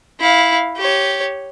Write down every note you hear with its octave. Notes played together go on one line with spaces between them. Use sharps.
E4 F5
G4 C#5